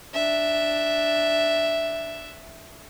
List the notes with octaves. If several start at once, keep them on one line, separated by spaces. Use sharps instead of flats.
D4 E5